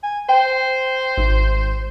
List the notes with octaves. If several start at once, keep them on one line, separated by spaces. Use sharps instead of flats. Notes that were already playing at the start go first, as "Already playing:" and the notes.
G#5
C5 G5
G#1